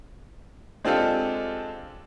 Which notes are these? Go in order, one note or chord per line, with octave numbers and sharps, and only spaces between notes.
G#3 C4 D4 F4 G4 A4